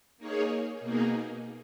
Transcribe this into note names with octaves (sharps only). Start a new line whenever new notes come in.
A#3 D#4 G#4 C#5
B2 A#3 D#4 G#4